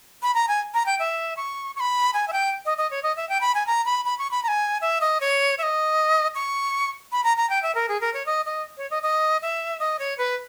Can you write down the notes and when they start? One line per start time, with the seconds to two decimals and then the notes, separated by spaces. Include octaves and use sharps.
0.22 B5
0.35 A#5
0.48 G#5
0.74 A#5
0.86 G5
0.99 E5
1.37 C#6
1.76 C#6
1.80 B5
2.14 G#5
2.28 E5
2.33 G5
2.65 D#5
2.78 D#5
2.91 C#5
3.03 D#5
3.16 E5
3.29 G5
3.41 B5
3.55 G#5
3.67 A#5
3.86 B5
4.05 B5
4.19 C#6
4.31 B5
4.43 A#5
4.48 G#5
4.81 E5
5.01 D#5
5.21 C#5
5.58 E5
5.63 D#5
6.35 C#6
7.12 B5
7.24 A#5
7.37 A#5
7.50 G5
7.63 E5
7.75 A#4
7.89 G#4
8.01 A#4
8.14 C#5
8.26 D#5
8.45 D#5
8.77 C#5
8.91 D#5
9.03 D#5
9.42 E5
9.80 D#5
9.99 C#5
10.18 B4